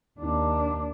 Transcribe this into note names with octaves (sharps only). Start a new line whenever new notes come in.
D#2 D4